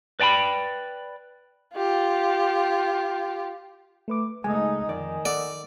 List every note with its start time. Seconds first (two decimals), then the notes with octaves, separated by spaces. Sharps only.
0.20 B4 D5 G5 A5 B5
1.75 F4 G4
4.08 A3 B4 D6
4.44 C#2 G#3 A3 D#4 G#5
4.88 F2 D#3 D5
5.25 A4 D5 F#5